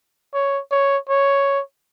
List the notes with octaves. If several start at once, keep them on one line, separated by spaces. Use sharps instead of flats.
C#5
C#5
C#5